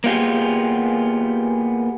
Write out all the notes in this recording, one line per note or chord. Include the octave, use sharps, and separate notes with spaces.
A#3 B3 F4 G4 G#4